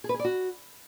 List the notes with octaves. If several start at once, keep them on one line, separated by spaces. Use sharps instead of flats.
G#4
B4
G#4
D5
F#4